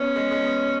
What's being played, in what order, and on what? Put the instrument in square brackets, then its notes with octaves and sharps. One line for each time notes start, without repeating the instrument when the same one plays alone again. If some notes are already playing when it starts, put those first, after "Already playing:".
Already playing: [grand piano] B3 [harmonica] C#4
[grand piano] G#3
G#3
B3